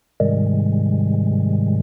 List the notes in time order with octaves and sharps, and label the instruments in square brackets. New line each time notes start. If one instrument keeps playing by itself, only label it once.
[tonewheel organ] G#2 C3 D#3 G3 G#3